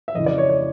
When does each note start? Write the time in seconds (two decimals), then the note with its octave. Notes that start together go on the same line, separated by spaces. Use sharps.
0.08 E5
0.14 F2 C#3 E3 D#5
0.26 D5
0.38 C#5
0.49 C#5